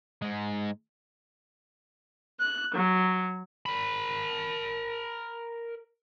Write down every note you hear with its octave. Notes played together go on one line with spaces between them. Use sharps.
G#2 G#3
F#6
F#3
A#4 B5